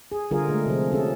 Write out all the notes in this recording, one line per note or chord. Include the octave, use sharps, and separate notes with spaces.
G#4
D3 G3 F4 G#4 A#4
D3 G#3 A3
C3 F3
C#4 G#4 A4